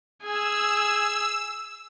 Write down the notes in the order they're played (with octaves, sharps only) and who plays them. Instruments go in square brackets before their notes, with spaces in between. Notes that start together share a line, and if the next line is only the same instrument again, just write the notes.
[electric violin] G#4 G#5 [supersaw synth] E6